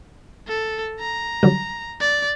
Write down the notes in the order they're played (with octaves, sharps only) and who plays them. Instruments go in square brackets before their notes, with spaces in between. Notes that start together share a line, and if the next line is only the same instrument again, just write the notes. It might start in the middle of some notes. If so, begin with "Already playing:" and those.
[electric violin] A4
A#5
[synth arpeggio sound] D3 F#3 G3
[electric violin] D5